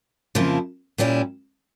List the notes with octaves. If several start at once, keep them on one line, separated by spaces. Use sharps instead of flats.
F2 C#3 F3 A#3 E4
A#2 G3 C#4 E4